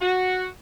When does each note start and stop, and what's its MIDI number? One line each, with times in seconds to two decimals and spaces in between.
0.01 0.45 66